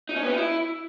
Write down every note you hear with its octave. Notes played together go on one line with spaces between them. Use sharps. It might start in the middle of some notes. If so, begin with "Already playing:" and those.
D#4
C#4
B3
D#4
E4